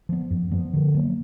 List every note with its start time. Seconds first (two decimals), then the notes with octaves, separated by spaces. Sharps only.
0.09 F3 B3
0.31 F#2
0.51 F3 B3
0.73 D3
0.94 F#3 A#3